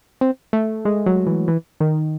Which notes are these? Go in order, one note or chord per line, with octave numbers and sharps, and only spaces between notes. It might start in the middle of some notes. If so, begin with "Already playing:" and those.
C4
A3
G#3
F#3
E3
E3
D#3